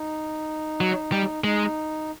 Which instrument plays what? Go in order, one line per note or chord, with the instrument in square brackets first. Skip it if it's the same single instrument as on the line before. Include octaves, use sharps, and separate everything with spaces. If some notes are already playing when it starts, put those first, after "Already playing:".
Already playing: [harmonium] D#4
[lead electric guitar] F#3
G3
[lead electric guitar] G#3 [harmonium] D#4